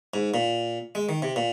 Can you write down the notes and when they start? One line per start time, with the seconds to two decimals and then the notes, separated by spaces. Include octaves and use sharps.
0.14 G#2
0.34 A#2
0.95 G#3
1.09 D#3
1.22 C3
1.36 A#2